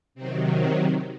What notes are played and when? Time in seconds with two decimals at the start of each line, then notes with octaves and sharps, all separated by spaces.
0.15 C3 D#3 F#3 C4
0.57 C4